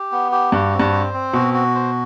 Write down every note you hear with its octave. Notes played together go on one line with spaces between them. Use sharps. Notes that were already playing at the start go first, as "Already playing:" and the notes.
Already playing: G4
B3
G4
G2 F#4
C4
G2
C5
C4
B2 F#4
F#4
C5